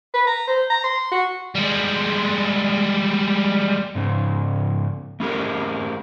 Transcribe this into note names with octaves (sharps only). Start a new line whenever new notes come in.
B4
A#5
C5
A#5
C6
F#4
G3 G#3
G#2 C#3
A3 C#4 G4 A#4